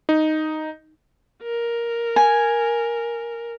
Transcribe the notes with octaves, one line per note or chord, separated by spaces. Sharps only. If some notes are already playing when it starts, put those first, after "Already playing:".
D#4
A#4
G#5